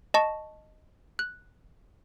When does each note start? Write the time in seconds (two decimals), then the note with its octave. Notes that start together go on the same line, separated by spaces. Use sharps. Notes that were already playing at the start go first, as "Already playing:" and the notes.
0.14 D#5 A5 C#6
1.19 F#6